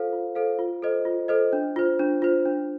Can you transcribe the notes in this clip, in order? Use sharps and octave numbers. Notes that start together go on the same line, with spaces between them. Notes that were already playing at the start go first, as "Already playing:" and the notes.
Already playing: F4 A4 C5 F5
F4
A4 C5 F5
F4
A4 C5 D#5
F4
A4 C5 D#5
D4
F4 C5
D4
F4 C5
D4